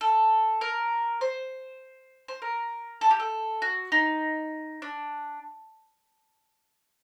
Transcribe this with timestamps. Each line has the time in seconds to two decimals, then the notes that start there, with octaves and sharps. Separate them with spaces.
0.01 A4
0.61 A#4
1.21 C5
2.28 C5
2.42 A#4
3.01 A4
3.11 G4
3.20 A4
3.62 F#4
3.92 D#4
4.82 D4